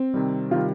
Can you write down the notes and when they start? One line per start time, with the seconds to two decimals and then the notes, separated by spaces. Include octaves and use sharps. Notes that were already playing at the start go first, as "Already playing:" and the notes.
Already playing: C4
0.14 C3 D#3 G3
0.51 C3 D#3 G3 F4